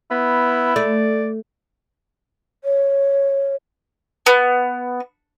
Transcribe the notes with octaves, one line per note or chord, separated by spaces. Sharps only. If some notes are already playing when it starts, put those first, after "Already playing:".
B3 E4
A3 D5
C#5
B3